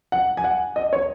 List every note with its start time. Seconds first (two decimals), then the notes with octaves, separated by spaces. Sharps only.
0.12 F#5
0.37 G#5
0.44 F#5
0.76 D#5
0.93 C#5